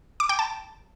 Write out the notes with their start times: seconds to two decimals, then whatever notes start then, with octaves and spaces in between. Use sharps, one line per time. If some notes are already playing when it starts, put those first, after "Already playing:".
0.20 D6
0.29 G5
0.39 A5